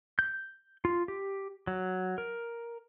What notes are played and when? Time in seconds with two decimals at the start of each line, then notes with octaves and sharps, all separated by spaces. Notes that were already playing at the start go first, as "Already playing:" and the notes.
0.19 G6
0.85 F4
1.08 G4
1.67 F#3
2.18 A#4